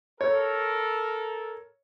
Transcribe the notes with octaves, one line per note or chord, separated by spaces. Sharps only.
A4 A#4 C#5